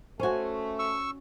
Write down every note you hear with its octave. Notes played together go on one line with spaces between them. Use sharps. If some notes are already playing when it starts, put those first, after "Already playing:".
A3 C#4 F#4 C5 G#5
C#6 E6